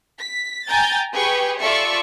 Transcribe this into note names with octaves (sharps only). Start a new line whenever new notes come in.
B6
G5 G#5 A#5 G6 A6
G4 G#4 B4 G5 C#6
F4 A4 D5 E5 C#6